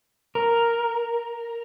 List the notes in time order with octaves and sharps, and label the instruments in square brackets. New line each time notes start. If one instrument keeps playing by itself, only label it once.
[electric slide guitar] A#4